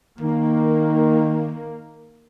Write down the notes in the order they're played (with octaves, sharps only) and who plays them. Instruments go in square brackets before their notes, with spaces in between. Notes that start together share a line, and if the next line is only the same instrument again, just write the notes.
[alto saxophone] D#3 [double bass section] A#3